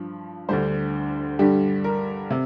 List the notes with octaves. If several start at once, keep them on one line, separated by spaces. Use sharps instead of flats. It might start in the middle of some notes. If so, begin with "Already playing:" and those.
Already playing: G2 F3
D2 D3 G3 C5
G2 D3 G3 G4
A#4
C3